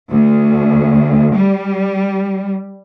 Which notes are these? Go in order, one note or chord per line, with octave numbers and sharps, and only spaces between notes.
D2
G3